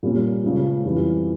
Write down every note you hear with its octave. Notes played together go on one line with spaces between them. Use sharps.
A#2 G3 A#3 C#4
C#2 C#3 F3
F2 E3 G3